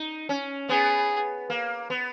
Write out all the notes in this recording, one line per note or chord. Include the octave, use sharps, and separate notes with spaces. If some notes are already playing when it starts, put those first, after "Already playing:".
Already playing: D#4
C#4
B3 G#4
A#3
B3